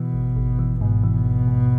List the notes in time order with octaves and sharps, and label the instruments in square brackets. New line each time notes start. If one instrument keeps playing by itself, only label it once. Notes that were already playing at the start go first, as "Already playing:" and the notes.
Already playing: [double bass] B2 [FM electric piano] E3
[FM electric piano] G#1
G#1
E3
[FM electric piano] G#2 [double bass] B2
[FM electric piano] E3
G#1
G#2